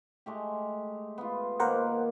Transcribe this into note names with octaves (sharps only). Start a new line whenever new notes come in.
G#3 A3 G4
B3 F4
D#3 A#3 A#4 C5 F#5